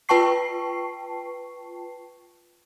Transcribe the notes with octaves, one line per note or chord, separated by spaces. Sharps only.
F4 B4 G5 A5 C#6 C7